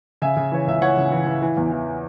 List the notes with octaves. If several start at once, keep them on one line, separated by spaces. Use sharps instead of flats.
C#3 E5 G#5
C#3
E3 C#5
C#2 E5
E3 C#5 F#5
C#3
E3
E3
E3
E2
E3